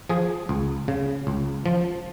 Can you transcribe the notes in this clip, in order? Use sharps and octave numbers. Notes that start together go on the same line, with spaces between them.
F3 G#4
C#2
C#3
C#2
F3